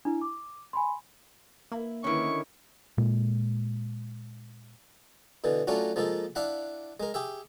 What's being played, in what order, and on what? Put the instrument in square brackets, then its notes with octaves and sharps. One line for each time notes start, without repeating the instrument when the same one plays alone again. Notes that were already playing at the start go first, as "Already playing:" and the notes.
[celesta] D4 E4
D6
G#5 B5 C6
[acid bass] A#3 [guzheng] E4
[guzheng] D3 D#3 [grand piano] C#4 E4 [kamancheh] C#6
[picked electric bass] A#2 G#3
[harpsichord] B2 D3 E3
F#3 A3 C#4 D4 F4 F#4
F3 G#3 A#3 A4
D4 E4 F5 F#5 B5
G#3 A#4
G4 G#4 E5